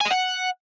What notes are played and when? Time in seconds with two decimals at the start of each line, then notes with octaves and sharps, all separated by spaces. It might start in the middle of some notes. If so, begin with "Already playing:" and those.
0.01 G#5
0.06 D#5
0.11 F#5